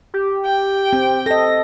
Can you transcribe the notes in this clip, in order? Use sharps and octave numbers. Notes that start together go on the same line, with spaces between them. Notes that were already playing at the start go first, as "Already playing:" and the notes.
G4
G5
C4
A4 D#5 A#6